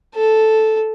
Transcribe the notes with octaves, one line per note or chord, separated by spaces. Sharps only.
A4